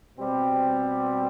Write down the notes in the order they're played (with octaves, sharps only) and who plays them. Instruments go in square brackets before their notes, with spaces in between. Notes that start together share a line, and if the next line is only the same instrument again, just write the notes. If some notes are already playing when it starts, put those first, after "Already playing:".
[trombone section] B2 G3 C4 G4